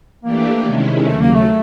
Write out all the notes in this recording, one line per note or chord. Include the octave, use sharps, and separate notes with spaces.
E3 A3 A#3 D4 G4
C3 D#3 G#3 C#4 E4
D#2 C#3 F#3 A3
A#3
A3